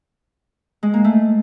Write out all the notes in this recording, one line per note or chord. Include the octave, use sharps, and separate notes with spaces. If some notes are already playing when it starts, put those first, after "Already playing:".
G#3
A#3
A3